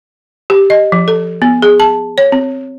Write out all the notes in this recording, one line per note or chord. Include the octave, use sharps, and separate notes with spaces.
G4
D#5
F3
A4
B3
G#4
A5
C#5
C4